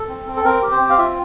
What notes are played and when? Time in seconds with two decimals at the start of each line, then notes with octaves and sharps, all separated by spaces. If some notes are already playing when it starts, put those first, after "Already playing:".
Already playing: A4
0.09 C4
0.27 C4
0.37 A4
0.45 C4 A#4
0.62 G4
0.71 C5
0.81 C4
0.90 F5
0.98 F4 E5